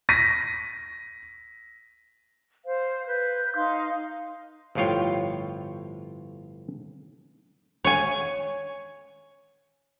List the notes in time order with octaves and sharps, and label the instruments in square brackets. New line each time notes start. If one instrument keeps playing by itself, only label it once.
[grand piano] A#6 B6 D#7
[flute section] C5 F5
B4 G6
D#4 F5 C6
[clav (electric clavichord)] G1 A2 F3 F4 C#5 G5
[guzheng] C#5 G#5